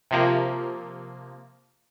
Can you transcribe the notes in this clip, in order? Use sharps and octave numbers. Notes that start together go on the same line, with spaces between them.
C3 F3 A#3